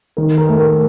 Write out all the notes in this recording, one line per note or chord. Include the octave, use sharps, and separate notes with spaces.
D#3 A#4
A#4
A3
A#4